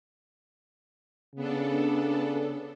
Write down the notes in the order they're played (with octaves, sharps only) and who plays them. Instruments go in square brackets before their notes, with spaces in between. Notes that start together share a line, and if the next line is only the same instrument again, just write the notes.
[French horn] C#3 [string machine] B3 D4 A4